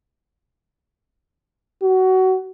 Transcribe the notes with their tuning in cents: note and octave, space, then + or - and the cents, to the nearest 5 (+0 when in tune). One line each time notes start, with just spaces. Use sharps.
F#4 +20